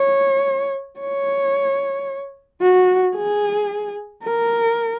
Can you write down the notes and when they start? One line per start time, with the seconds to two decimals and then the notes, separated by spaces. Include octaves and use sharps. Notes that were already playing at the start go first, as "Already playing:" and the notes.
Already playing: C#5
1.00 C#5
2.62 F#4
3.16 G#4
4.24 A#4